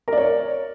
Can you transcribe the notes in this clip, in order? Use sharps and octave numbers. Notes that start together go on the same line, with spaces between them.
A#4 C#5 D5